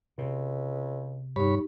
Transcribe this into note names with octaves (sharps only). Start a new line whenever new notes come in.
C#2 C3
G2 D#4 G4 C#5 B5